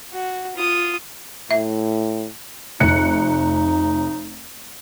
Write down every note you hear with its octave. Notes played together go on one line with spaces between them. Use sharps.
F#4
F4 D#6
A2 E5
F1 D#4 F#6 C#7